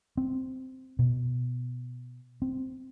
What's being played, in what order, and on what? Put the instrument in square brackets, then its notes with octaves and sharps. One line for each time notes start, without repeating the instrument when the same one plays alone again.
[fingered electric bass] C4
B2
C4